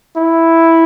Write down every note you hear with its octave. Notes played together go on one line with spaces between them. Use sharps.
E4